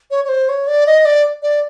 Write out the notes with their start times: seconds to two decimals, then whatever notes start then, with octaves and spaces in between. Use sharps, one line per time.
0.11 C#5
0.25 C#5
0.29 C5
0.49 C#5
0.67 D5
0.86 D#5
1.05 D5
1.42 D5